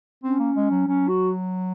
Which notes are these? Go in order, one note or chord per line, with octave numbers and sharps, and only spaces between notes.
C4 C#4
A#3
G#3
F#3
F#3 C#4
F#4